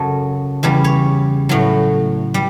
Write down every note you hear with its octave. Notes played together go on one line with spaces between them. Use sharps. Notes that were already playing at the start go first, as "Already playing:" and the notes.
Already playing: F#2 C#3 F#3 A4
E2 C#3 G3
C#5
A2 F#3
G3